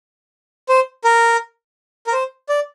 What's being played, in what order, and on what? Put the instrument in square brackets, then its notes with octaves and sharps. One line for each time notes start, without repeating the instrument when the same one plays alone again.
[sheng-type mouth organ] C5
A#4
A#4
C5
D5